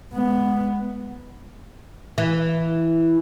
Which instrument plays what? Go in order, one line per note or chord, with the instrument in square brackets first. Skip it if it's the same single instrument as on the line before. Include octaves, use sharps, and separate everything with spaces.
[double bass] G#3 B3
[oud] E3